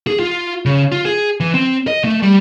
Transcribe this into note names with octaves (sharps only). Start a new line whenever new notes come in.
G#4
F4
C#3
F4
G#4
E3
C4
D#5
A3
G3